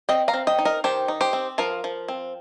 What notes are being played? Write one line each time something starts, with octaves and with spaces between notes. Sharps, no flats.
C4 D#5 G5
F5 A#5
C4
D#5 G5
D#4
A#4 D#5
D#3 G4 C5
D#4
G4 C5
C4
F3 F4 A#4
F3
C4